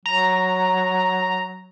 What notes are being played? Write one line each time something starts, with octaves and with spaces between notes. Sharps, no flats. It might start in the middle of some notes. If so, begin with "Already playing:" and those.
F#3 A#5